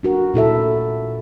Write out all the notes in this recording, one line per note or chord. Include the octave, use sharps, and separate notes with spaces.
D4 F#4 A#4
A#2 E4 A4 E5